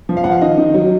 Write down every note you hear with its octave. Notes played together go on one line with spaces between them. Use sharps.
F3
F5
F3 F#5
F5
D#3 D#5
D#3
F#3